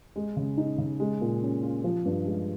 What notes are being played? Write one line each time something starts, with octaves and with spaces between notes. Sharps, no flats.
G#3
C#3
D#4
C#3
G#3
A#2
C#4
F4
F3
G2
G#3